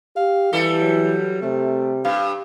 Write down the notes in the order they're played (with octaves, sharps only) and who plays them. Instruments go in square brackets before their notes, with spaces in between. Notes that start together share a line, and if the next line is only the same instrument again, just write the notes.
[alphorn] G4 [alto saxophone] F5
[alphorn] E3 [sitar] G3 A4
[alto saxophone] F#3
[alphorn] C3 [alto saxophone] A3
[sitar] G2 [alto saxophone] F5